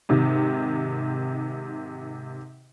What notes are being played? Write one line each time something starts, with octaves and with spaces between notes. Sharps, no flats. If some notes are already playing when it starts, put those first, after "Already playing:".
G#2 C3 D#3